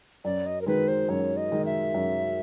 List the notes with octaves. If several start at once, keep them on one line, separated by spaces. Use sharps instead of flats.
F#2 D5
D#5
A#4
D#3 G#3 B4
C5
F#2 C#5
D#5
D#3 G#3
E5
F#2